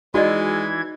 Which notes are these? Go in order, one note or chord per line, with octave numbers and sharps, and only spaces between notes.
E3 G#3 D#4 E4 F#4 D5 D#5 G#6